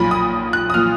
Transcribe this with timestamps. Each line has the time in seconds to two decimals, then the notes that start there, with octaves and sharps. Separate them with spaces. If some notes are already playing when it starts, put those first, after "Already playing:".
Already playing: B1 A#2 F3 B5
0.11 D#6
0.53 F#6
0.70 D#6
0.74 A#2 F3 F6